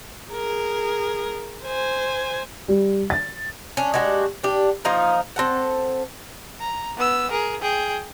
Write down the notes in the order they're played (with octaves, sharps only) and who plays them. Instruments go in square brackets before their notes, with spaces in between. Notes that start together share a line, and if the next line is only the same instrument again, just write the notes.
[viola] G#4 A#4
C5 G#5
[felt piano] G3
A6
[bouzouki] C#4 D4
G#3 D4 F#4 G4
D4 G4
F3 A#3 D#4 A#4
C4 A4 F#5
[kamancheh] A#5
B3 E6
G#4 A#4
G#4 G5